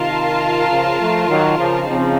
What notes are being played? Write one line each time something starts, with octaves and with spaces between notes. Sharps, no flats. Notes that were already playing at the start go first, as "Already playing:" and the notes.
Already playing: C3 D#3 F4 A#4 F5 A5
C#3 F3
F3 A3
D#3 F#3
C#3 F3
C#3 F3 C4 D#4